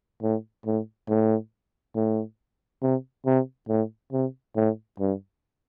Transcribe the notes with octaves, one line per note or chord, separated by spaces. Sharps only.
A2
A2
A2
A2
C3
C3
A2
C3
A2
G2